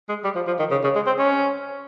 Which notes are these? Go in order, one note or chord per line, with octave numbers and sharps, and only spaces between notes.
G#3
G3
F3
F3
D#3
C#3
C#3
G#3
C4
C#4